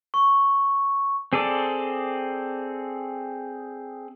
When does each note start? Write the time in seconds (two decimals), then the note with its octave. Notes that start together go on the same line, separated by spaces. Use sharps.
0.14 C#6
1.33 C4 G#4 A4 D5